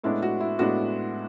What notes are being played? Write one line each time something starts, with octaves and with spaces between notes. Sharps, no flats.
A2 G#3 B3 D4 E4
F#4
E4
A2 G#3 B3 D4 F#4